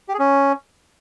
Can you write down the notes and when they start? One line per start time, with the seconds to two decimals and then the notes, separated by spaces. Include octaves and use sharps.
0.09 G4
0.14 G#4
0.19 C#4